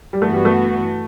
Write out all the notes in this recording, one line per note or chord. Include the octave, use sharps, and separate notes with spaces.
G3
G2 E3 A3 B3 F#4
G3
A3